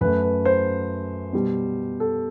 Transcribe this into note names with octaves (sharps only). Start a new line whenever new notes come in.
F#2 F#3 A3 B4
B4
C5
B2 G3
A4